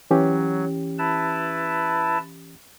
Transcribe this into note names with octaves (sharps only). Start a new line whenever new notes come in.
E3 F#3 C#4 G4
E4 B4 A5